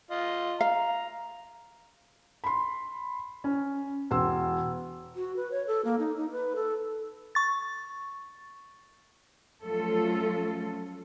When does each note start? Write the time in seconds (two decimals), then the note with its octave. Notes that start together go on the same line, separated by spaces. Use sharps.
0.11 F4 D#5
0.61 F5 A#5
2.44 B5 C6
3.44 C#4
4.11 E1 C6 E6
5.16 F#4
5.36 B4
5.51 C#5
5.67 A4
5.85 A#3
5.99 D#4
6.17 D#4
6.31 B4
6.56 A4
7.35 C#6 A6
9.63 F3 F#3 A3 C#4 F4 A4